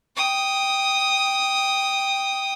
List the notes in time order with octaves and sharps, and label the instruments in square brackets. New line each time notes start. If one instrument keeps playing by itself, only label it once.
[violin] G5 D#6